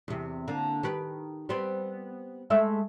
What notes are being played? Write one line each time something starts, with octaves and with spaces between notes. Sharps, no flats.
E2 C3
D3 A#3
D#3 G4 B4
G3 B3 C4
G#3 A3 E5